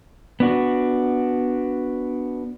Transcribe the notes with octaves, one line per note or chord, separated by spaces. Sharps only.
B3 D4 F#4